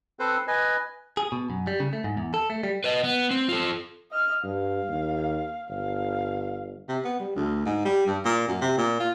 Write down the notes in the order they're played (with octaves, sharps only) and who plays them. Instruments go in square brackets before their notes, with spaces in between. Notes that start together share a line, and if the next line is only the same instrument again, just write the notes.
[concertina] C4 A4 B4 C5
B4 D#5 G#5
[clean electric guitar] G#4
B2
F#2
G3
C#3
A3
G#2
E2
A4
A3
G3
[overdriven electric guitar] B4 D#5
B3
C4
F4 A4
[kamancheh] D#5 F6
[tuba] G2 [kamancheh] F5
[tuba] D#2
[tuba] G1 [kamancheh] F5
[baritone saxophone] C3
B3
G3
D2
G#2
G3
G2
A#2
F#2
C3
A#2
F4